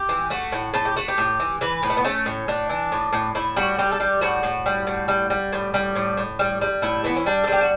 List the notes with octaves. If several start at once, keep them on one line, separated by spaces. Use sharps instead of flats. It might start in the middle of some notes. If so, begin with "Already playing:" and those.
Already playing: G4
E3
A3 F#4
A2
A2 A4
G4
A3 F#4
G4
A2
E3
E3 B4
A2
A3
B3
A3 C#4
A2
A2 D4
E3
A2
A2
A2 E4
G3 F#4
G3 G4
A4
G3 G4
A2 F#4
A2
G3
A2
G3
G3
A2
G3
A2
A2
G3
G3
A2 E4
E3 B3
C#4
G3 D4
A4
G3
G4
F#4